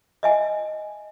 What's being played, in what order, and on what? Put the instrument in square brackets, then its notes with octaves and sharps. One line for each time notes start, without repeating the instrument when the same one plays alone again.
[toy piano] D#5 E5 G#5